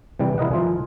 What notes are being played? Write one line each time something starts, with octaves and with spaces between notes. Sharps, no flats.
C3 E3 G3
E4 A#4 D#5 F#5
F3 F4 G#5